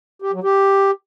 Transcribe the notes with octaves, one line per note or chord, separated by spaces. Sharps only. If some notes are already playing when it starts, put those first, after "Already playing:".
G4
F#3
G4